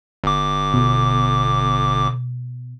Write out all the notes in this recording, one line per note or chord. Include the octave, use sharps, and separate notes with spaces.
G1 D6
B2